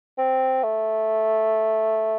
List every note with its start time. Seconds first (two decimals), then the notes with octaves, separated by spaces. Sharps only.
0.18 C4
0.63 A3